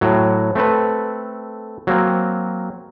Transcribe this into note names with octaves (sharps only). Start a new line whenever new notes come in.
A2 F#3
A3 C4 A4 B4
F#3 A#3 C4